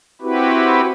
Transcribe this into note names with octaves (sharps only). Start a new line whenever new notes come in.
C4 E4 F#4 G4 B4